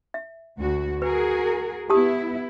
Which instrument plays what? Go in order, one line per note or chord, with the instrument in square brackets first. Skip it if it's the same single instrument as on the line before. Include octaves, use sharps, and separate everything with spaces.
[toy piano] E5
[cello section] D2 F#4
[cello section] F#4 G#4 A#4 [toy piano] B4
[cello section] B3 E4 [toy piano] G4 A5 D#6